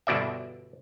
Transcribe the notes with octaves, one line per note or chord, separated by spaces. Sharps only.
G1 B2 D5 E5